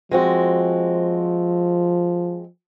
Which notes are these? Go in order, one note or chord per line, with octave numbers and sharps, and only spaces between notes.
F3 G#3 C4 F#4